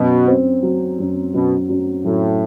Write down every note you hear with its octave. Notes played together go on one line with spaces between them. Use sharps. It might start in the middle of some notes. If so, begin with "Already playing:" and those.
Already playing: F#2 B2
C4
F#3
F#2
F#2 B2
F#2
A2 F#3